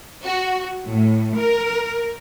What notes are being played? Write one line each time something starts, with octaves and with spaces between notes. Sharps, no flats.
F#4
A2
A#4